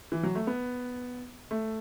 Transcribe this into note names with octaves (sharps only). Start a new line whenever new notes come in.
E3
F#3
A3
B3
A3